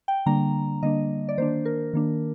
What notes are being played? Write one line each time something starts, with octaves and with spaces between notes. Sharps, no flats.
G5
D3 G3 A#3 D4 A#5
D3 G3 A#3 D4 D#5
D5
D#3 A#3 D4 C5
A#4
D#3 A#3 D4